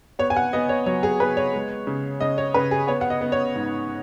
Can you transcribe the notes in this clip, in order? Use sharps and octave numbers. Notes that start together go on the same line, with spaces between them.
B3 C#5
G#5
F#5
B3 D#5
C#5
F#3 C#5
G#4
B3 B4
C#5
G#3
C#3
C#3 D#5
C#5
C#3 B4
G#4
B3 C#5
F#5
D#5
B3
C#5
G#2